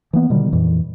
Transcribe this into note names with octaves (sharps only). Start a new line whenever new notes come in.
E3 A#3 B3
B2 D3 D#3 G3
F2 A#2 E3